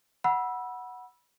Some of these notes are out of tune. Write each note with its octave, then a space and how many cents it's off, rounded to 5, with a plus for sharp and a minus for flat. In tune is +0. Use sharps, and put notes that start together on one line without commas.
F#5 +0 B5 -25 E6 +0